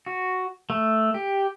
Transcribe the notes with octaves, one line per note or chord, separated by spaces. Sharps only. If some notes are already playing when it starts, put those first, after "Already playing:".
F#4
A3
G4